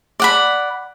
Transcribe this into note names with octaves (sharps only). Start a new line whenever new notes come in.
D5 F#5 B5